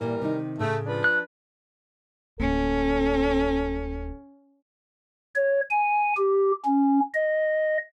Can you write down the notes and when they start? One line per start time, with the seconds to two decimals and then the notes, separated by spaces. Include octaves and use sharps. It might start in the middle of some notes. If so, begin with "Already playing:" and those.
0.01 A#2 E3 G3 A#4
0.21 C3 D#3 D#4
0.59 A2 C#3 A3
0.86 F3 D4 B4
1.04 F#6
2.40 D1 A#3 C#4 A4
5.35 C#5
5.70 G#5
6.17 G4
6.65 C#4
7.14 D#5